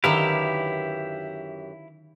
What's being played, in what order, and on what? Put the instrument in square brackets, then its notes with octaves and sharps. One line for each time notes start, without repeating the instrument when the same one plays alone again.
[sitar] F#2 G4 B4 [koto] D3 D#3 D#4 [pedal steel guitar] E4 F5